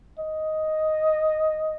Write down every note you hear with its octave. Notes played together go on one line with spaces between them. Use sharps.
D#5